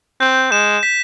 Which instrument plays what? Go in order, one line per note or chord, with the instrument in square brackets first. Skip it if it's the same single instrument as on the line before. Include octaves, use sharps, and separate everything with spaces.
[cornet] C4 [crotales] G6
[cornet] G#3 [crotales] E7
[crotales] B6